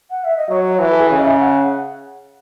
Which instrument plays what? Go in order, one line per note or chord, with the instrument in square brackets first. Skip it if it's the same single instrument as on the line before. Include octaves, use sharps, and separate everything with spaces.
[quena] F#5
E5
D#5
[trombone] F#3 [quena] C#5
[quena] C#5
[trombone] E3 [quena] F#4
[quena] A4
G#4
[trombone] C#3
[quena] D#5
E5
F#5